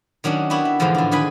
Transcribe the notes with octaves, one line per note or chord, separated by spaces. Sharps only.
D#3 F#3 C#4 D4
B3 D4 E4 F#4 G4
E5
E2 G#2 B2 D3 E3 F3
A2 D4
D3 D#3 G#4 B4 G#5 B5